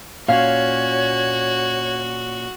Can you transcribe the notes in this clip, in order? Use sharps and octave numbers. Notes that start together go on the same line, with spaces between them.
A#2 C#4 F#4 C#5 F5